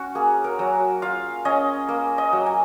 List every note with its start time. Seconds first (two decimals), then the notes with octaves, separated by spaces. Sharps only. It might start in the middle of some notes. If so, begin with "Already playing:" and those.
Already playing: C#4 F#4
0.15 A#3 G#4
0.44 A#4
0.59 F#3
1.02 F4 F5
1.45 C#4 D#5
1.89 A#3
2.18 D#5
2.33 F#3
2.46 G#5